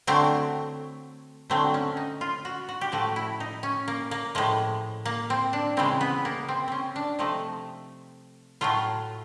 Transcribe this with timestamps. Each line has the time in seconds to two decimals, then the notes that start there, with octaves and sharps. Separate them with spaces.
0.07 D3 F#3 A3 C4
1.50 D3 F#3 A3 C4
1.74 C#4
1.97 D#4
2.21 F4
2.45 F#4
2.69 F#4
2.81 G4
2.92 A2 F3 A3 F#4
3.16 E4
3.40 D#4
3.63 C#4
3.88 A#3
4.11 A#3
4.35 A2 F3 G#3
5.05 A#3
5.30 C4
5.53 D4
5.77 C#3 E3 G#3 C4
6.01 B3
6.25 A#3
6.48 C4
6.68 C4 C#4
6.96 D4
7.19 C3 F3 A3 D#4
8.61 A2 F#3 A3 F4